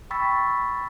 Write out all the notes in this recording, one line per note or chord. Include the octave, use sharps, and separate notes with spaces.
G5 B5 C#6 E6 A6 B6